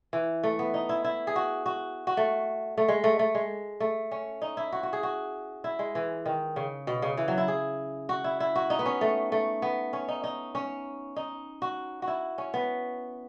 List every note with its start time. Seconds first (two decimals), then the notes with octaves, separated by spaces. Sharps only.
0.13 E3
0.43 A3
0.59 B3
0.74 D#4
0.89 E4
1.04 E4
1.27 G#4
1.36 F#4
1.66 F#4
2.07 F#4
2.17 A3
2.77 A3
2.88 G#3
3.04 A3
3.19 A3
3.35 G#3
3.80 A3
4.11 C#4
4.42 D#4
4.57 E4
4.72 F#4
4.83 F#4
4.93 G#4
5.03 F#4
5.64 E4
5.79 G#3
5.95 E3
6.26 D#3
6.56 C#3
6.87 B2
7.02 C#3
7.17 E3
7.28 F#3
7.38 E4
7.48 G#4
8.09 F#4
8.24 E4
8.40 E4
8.56 F#4
8.70 D#4
8.79 B3
8.86 C#4
9.01 A3
9.32 A3
9.62 B3
9.93 C#4
10.08 D#4
10.24 D#4
10.55 C#4
11.16 D#4
11.62 F#4
12.02 F#4
12.07 E4
12.38 C#4
12.54 B3